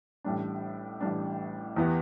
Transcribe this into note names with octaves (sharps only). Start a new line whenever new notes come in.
A1 A2 G3 D4
A1 A2 G3 D4
E2 E3 B3 G4